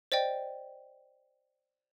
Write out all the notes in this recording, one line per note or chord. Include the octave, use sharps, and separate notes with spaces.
C5 D5 D#5 G5